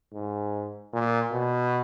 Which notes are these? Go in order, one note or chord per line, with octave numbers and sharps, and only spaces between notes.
G#2
A#2
B2